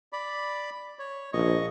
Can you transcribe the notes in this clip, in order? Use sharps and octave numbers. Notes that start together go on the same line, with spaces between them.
D5 B5
C#5
A#1 D#5 C#6